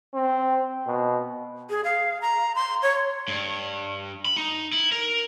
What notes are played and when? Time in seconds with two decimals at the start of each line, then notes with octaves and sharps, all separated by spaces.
0.14 C4
0.87 B2
1.70 G#4
1.84 F5
2.22 A#5
2.55 C6
2.82 C#5
3.28 G2
4.25 B5
4.36 D#4
4.72 E4
4.92 A#4